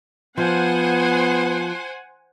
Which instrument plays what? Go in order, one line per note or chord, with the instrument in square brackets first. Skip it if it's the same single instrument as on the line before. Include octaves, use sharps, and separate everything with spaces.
[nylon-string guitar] F3 [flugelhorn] B3 [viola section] C5 F#5 G#5